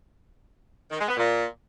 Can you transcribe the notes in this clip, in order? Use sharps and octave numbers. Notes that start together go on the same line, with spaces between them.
D#3
G#3
B3
A#2